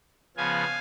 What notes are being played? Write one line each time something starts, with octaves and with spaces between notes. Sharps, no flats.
C#3 F3 B3 F5 G#5